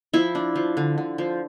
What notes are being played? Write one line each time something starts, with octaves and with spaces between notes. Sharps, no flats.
F3 E4
D4
F3
D3
D3
F3